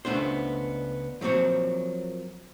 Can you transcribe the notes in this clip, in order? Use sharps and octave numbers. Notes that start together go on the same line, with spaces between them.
C#2 A3 B3 D4 C5
F3 F#3 A#3 C4 C#5